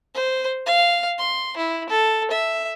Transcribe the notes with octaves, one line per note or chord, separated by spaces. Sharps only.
C5
F5
C6
E4
A4
E5